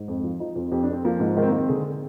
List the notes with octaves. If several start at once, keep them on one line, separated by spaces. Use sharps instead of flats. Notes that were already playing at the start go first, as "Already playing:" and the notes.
Already playing: G#2
F2
F3
F3 D#4
F2 F4
F2 G4
D4
F2 C4
F3 A#3
G#2
D#3 G#3
C4
A#3
D#3
C4
D3 G#4
G#4